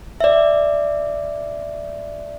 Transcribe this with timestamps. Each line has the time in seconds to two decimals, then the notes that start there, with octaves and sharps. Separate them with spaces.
0.21 D5 E5